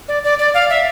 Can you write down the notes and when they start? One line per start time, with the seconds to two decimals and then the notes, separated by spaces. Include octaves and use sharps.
0.08 D5
0.24 D5
0.39 D5
0.54 F5
0.70 E5